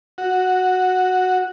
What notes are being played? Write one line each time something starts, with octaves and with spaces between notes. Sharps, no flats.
F#4